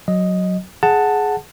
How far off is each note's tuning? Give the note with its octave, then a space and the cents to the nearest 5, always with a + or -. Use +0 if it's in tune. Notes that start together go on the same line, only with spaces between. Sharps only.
F#3 -5 D#5 +0
G#4 +15 F#5 +0 A5 +10